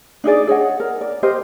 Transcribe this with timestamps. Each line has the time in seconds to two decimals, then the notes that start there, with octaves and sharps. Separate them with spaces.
0.24 D4 D#4 G#4 D5
0.47 G#4 C#5 D#5 F#5
0.80 A#4
1.01 D5
1.23 G4 A#4 C5 D#5